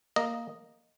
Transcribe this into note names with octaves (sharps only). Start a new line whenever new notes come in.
A#3 D#5